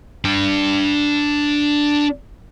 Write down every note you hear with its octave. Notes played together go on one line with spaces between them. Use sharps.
D4 G5